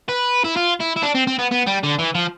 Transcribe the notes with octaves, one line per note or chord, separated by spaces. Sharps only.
B4
E4
F4
E4
E4
D4
C4
C4
B3
B3
G3
D3
E3
F3